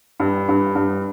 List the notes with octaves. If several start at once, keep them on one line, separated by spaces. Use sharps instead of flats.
G2
G2
G2